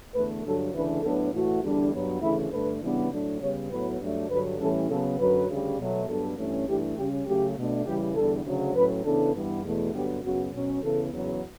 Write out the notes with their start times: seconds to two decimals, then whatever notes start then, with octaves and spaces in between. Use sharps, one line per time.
0.15 E2 D3 A3 B4
0.44 G2 D3 F#3 A4
0.73 D2 C#3 E3 A3 D4 B4
1.03 A2 F#3 B3 D4 A4
1.33 A2 E3 A3 F#4
1.62 E2 D3 G3 D4
1.93 G2 F#3 B3
2.22 D2 C#3 E3 A3 E4
2.51 G2 D3 A3 D4 B4
2.81 C#3 E3 G3 B3 D4
3.11 A2 F#3 A3 D4
3.41 C#3 G3 B3 C#5
3.70 A2 F#3 B3 B4
4.00 G2 F#3 A3 D4
4.30 G2 D3 F#3 B4
4.59 A2 E3 G3 C#4 A4
4.89 C#3 F#3 B3 A4
5.19 F#2 D3 F#3 B4
5.49 D2 C#3 G3
5.78 B2 F#3 A3
6.07 G2 F#3 B3 D4 A4
6.38 G2 E3 A3 C#4
6.67 G2 E3 A3 D4 G4
6.97 C#3 G3 C#4 G4
7.26 C#3 F#3 A3 C#4 G4
7.57 B2 A3 D4
7.86 C#3 E3 G3 G4
8.15 E2 D3 G3 A4
8.45 D2 C#3 F#3
8.75 A2 F#3 C#4 B4
9.04 C#3 E3 B3 D4 A4
9.34 G2 E3 G3 B3
9.64 E2 B2 A3
9.94 G2 D3 F#3 B3 G4
10.23 F#2 C#3 F#3 B3 F#4
10.53 B2 F#3 C#4
10.82 C#3 E3 B3 A4
11.12 E2 C#3 F#3 B3